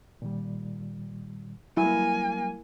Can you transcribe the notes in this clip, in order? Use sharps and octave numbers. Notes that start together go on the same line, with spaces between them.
A#2 D#3 G3
F#3 G3 A#3 E4 G#5